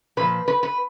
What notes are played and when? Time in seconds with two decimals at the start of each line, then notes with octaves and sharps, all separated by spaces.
0.17 A#2 F3 B4
0.48 B4
0.63 B4